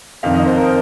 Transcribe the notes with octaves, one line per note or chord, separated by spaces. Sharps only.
F2 D#3 C4 F5
D#5
C5
A#4